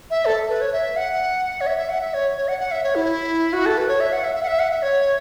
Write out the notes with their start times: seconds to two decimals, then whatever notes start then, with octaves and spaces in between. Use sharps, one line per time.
0.10 E5
0.26 A4
0.49 B4
0.61 C#5
0.73 E5
0.96 F#5
1.61 C#5
1.67 E5
1.78 E5
1.89 F#5
2.01 E5
2.14 C#5
2.37 C#5
2.48 F#5
2.60 F#5
2.71 E5
2.84 C#5
2.95 E4
3.53 F#4
3.66 A4
3.78 B4
3.88 C#5
4.00 E5
4.13 F#5
4.24 E5
4.35 E5
4.43 F#5
4.48 E5
4.59 F#5
4.71 E5
4.82 C#5